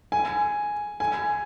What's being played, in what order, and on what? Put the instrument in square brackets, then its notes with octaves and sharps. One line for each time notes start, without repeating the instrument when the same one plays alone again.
[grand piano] G#5
G#5